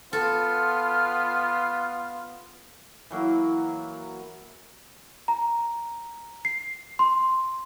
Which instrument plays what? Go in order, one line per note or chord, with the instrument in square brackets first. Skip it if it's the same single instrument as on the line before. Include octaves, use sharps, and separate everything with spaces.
[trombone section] B3 F4 [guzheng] A4 [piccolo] F6
[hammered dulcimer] E3 F#3 A#3
[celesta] A#5
C7
C6